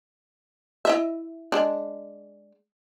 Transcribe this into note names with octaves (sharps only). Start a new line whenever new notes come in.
E4 D#5 E5
G#3 D4